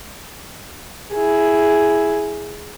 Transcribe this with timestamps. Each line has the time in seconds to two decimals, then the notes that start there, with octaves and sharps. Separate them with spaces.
1.13 E4 G#4